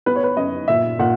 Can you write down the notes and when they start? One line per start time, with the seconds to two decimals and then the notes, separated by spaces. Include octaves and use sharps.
0.06 B3 B4
0.16 C#5
0.24 B4
0.37 F#2 D#5
0.68 A#2 E5
0.99 A#2 F#5